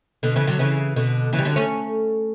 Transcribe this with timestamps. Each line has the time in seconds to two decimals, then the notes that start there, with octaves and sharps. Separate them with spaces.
0.23 B2 D3
0.36 C#3 E3
0.47 D3 F#3
0.59 C#3 E3
0.96 B2 D3
1.33 C#3 E3
1.39 G3
1.45 D3 F#3
1.56 A3 C#4